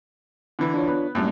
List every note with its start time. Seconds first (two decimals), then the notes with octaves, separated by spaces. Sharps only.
0.59 D3 E3
0.74 D4 F4 C#5
0.87 B3
1.15 F#2 A2 G3 A#3 D4